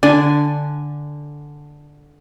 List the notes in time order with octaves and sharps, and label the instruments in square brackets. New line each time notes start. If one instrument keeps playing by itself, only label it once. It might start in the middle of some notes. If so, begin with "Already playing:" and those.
[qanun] D3 G#5 [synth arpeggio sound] D4 D5